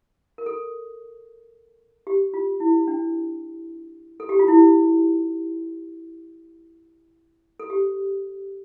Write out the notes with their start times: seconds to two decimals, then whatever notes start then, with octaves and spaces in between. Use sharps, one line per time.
0.38 A#4
0.46 A4
2.07 G4
2.34 F4
2.60 E4
2.88 D4
4.20 A4
4.29 G4
4.39 F4
4.48 E4
7.60 A4
7.70 G4